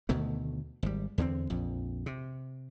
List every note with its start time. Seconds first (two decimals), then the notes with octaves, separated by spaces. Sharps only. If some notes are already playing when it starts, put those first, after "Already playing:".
0.09 D2 B2 D#3 A3
0.83 G#1 G3
1.18 E2 D3 B3 C4
1.50 A#1 F2
2.06 C3